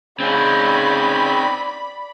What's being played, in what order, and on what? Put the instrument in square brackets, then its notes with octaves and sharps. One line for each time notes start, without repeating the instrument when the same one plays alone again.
[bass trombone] C#3 [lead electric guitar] C4 D#4 [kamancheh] D5 B5